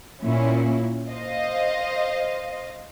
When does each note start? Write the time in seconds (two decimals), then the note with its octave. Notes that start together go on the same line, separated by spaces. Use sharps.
0.23 A#2 C#4 E4
1.11 C5 D#5 F5